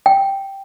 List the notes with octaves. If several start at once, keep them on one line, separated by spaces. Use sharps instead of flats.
G5